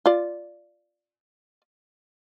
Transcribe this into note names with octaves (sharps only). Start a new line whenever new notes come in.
F4 D5